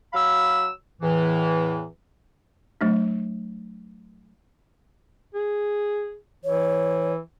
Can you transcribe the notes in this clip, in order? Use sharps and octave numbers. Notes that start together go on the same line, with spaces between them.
F#3 F5 B5 E6
E2 A2 E3
F#3 A3 D4
G#4
E3 C#5